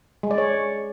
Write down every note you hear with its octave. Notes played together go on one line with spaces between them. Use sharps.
G#3
D5
C#5